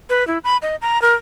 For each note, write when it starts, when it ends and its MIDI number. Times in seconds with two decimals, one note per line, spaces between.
0.10 0.26 71
0.27 0.38 64
0.44 0.57 83
0.62 0.76 75
0.82 1.01 82
1.02 1.14 70